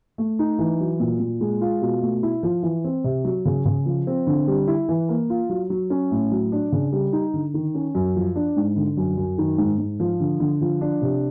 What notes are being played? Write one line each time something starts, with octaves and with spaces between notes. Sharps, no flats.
A3
D#4
E3
F#3
A#2
A#2
G#3
F4
B2
A3
E4
F3
E3
C4
C3
F#3
C#3
C#3
F3
C4
D3
G3
E4
E3
A#3
F4
F#3
F#3
C#4
A2
F#3
D4
C#3
G3
D#4
D3
D#3
C#4
F#2
F3
D4
G#2
D3
F#2
F#2
D#3
G#2
G#2
F3
D3
D3
F3
D4
C3